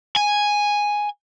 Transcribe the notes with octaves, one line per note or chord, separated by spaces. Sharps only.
G#5